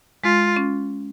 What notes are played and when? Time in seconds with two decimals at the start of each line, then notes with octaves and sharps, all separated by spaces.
0.24 G#3 F4
0.56 C#4